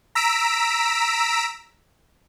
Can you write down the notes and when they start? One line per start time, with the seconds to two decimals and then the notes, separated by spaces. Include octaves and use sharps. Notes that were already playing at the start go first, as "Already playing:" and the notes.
0.15 A#5 E6 B6 D7